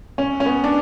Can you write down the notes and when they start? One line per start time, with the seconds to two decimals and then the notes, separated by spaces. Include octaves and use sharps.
0.18 C#4
0.40 C#4
0.46 B3
0.64 D4